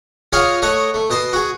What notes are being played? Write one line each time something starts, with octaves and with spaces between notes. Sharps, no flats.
F4 G#4 C#5 D#5 F5 F#5
A3 C#5 D#5 F#5
A3
B2 D#5 A5 C6
F#4 G#4